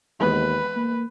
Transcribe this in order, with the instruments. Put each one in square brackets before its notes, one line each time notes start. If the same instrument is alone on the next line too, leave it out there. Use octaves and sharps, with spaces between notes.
[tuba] D#2 [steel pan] E3 G#3 B3 [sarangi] B4
[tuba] A#3